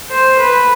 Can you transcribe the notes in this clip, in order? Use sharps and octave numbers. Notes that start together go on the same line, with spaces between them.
C5
B4